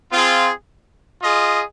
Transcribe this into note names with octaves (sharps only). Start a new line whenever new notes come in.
C4 F4 G#4
F4 G#4 D#5